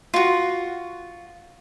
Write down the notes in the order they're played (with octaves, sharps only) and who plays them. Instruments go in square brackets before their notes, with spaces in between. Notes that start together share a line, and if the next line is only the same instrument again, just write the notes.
[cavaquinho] F4 F#4